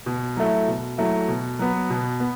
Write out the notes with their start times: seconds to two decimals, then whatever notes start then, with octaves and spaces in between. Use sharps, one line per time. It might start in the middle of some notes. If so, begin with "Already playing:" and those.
0.06 B2
0.37 F#3 A3 E4
0.68 B2
0.98 F#3 A3 E4
1.28 B2
1.59 F#3 B3
1.90 B2
2.20 B3